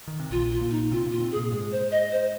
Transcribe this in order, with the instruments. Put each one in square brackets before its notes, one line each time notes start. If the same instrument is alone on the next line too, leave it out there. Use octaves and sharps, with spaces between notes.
[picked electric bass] D#3
C3
[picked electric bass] A#1 A#2 [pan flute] F4
[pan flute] F4
[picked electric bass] A#2 A#3
[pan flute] D#4
[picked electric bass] C3 C4 [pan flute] F4
[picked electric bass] A#2 A#3
[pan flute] F4
[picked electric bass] C3 C4
[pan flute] G#4
[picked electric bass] A#2 A#3
[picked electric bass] G#2 G#3 [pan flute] G#4
[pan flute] C5
D#5
C5